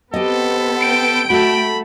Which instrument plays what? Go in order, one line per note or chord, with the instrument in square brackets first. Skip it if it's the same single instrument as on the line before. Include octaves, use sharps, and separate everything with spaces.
[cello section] B3 C4 [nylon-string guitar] G4 D#5 [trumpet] A4
[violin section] G5 D7
[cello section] A3 [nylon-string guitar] F#4 A4 [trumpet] B5